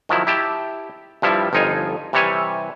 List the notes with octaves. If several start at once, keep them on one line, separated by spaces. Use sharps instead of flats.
D#3 F3 F#3 E4
E4 G4 A5
G2 F3 G3 E4
G1 F2 D#4 F4 G#5
C3 E3 G3 C#5 E5 G#5